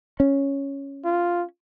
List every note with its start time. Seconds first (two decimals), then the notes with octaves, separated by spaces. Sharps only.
0.20 C#4
1.05 F4